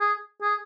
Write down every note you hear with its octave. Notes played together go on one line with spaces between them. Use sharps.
G#4
G#4